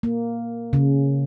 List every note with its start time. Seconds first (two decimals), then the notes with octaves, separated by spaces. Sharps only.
0.03 A#3
0.73 C#3